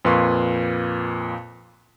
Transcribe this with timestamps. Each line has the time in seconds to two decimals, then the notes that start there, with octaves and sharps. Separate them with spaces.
0.05 F2 A#2 B4 F5 C6 C#6